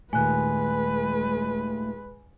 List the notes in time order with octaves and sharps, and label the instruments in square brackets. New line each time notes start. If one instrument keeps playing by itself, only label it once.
[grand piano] D#2 A#2 [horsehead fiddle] G#3 B4 [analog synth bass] A3 [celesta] G#5 F#6